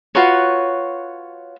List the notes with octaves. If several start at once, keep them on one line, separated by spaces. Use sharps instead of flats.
F4 F#4 B4 C#5